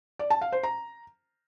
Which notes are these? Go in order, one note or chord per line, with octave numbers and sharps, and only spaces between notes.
D5
A5
F5
C5
A#5